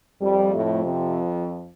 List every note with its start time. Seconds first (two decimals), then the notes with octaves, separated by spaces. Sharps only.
0.21 F2 F3 G3
0.52 A2 A3
0.84 C3 C4